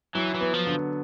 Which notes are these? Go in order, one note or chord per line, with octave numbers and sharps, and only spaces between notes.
E3 F#3
E3
B3
F3
D3